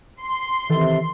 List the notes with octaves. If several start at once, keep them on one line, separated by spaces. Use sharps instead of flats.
C6
C3 D#3 E3 A4